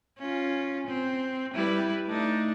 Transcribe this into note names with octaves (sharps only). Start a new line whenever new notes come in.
C#4 F4
C4
G3 E4 B4
A3 D4 D#4